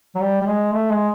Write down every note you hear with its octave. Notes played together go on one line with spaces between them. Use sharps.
F#3
G3
G3
G#3
A3
G#3